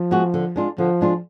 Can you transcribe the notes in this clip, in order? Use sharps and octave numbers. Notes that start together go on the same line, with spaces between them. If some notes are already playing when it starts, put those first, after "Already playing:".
Already playing: F3
G#3 B3 F#4
D3
G#3 D4 F4
D3 F3
G#3 D4 F4